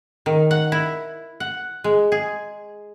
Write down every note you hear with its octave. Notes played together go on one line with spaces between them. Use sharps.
D#3
F#5
E4
F#5
G#3
G#4